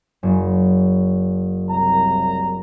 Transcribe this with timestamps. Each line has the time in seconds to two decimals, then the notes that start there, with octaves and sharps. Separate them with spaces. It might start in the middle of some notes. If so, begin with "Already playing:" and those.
0.23 F#1
1.69 C2 A#5